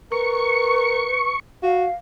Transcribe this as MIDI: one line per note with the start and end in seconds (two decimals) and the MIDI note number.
0.12 1.09 70
0.12 1.28 71
0.12 1.40 85
1.63 1.87 66
1.63 1.92 77